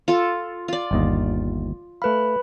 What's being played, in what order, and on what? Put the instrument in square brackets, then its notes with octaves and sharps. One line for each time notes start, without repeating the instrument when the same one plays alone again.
[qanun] F4 A4
F4 D5
[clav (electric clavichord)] G1 D#2 D#5
[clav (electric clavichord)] A3 F5 [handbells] B4 B5